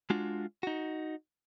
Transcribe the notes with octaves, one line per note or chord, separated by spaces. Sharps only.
G#3 D4 F4 F#4
D#4 F#4